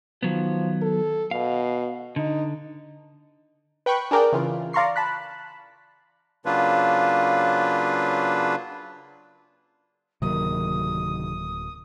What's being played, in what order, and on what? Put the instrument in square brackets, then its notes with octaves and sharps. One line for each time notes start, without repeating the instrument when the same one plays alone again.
[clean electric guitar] D#3 F#3 B3 [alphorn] F3
[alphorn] A4
[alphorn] B2 [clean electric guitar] F5
[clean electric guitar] D3 [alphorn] D#4
[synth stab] B4 G5 B5 C#6 F#6
D4 G#4 A#4 D5 G5
C#3 E3 F4
D5 F5 A#5 C6 C#6 C7
A5 B5 F#6
[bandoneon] C#3 F#3 A#3 D4 F4 B4
[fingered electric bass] D1 F#3 A#3 [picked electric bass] C3 D#3 [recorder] D#6